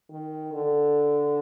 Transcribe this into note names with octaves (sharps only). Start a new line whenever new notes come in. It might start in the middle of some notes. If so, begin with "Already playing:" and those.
D#3
D3